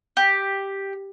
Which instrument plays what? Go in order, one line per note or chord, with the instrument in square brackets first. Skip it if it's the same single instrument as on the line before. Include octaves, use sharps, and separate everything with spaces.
[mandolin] G4